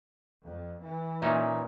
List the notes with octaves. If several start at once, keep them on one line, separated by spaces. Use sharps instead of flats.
F2
E3
A#2 C#4 D#4 E5